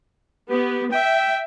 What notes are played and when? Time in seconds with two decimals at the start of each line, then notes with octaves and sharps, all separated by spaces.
0.50 B3 G4
0.92 E5 G5